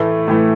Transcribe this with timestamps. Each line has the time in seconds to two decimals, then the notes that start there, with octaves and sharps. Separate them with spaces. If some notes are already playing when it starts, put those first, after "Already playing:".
Already playing: A2 E3 A3
0.28 A2 E3 A3